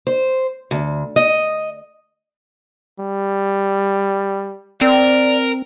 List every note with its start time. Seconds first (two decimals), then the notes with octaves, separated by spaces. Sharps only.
0.07 C5
0.71 D2
1.16 D#5
3.00 G3
4.81 C4 A#4 D5